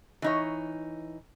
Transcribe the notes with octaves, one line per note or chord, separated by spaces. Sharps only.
E3 D#4 C#5